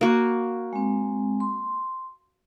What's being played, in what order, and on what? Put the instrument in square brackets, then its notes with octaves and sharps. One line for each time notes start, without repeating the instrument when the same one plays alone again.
[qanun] A#3 F#4
[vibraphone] G#3 C4
C6